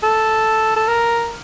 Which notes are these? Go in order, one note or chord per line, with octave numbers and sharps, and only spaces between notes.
A4
A4
A#4